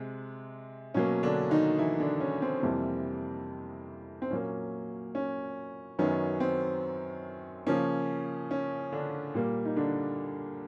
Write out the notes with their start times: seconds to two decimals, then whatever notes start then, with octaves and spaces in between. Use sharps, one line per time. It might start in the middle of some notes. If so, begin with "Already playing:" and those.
Already playing: C3 G#3
0.94 B2 F#3 A#3 C#4
1.23 D3 D4
1.51 D#3 D#4
1.78 E3 E4
2.00 D3 D4
2.20 C#4
2.42 C4
2.62 F2 C3 E3 G3 A#3
4.22 C4
4.31 A#2 F#3 A#3 C#4
5.15 C#4
5.99 F#2 D#3 F#3 B3 C#4
6.40 C4
7.67 C#3 F3 A#3 C#4
8.51 C#4
8.92 D3 D4
9.34 A#2 G3 A#3
9.65 D#4
9.77 D3 D4